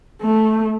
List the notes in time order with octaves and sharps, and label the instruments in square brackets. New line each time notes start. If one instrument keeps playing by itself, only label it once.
[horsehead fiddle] A3